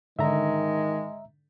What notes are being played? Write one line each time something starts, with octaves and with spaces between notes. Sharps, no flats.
G#2 D3 D#3 G#3 E5 A#5